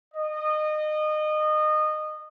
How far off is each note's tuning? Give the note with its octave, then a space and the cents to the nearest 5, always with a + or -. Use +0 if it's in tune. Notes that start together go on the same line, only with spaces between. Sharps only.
D#5 -25